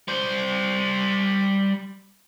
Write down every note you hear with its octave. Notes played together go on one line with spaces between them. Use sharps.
G3 C5